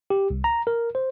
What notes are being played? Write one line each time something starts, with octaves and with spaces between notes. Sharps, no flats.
G4
C2
A#5
A#4
C5